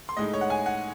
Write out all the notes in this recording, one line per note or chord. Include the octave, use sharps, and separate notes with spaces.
C6
A2 G#3 D#4 D#5
C#5
F#5
G#5
F#5